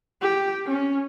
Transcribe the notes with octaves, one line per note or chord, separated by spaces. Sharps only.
G4
C#4